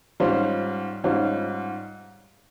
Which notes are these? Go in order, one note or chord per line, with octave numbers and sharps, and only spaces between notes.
G#2 G3 C#4 F4 C5
G#2 G3 C#4 F4 C5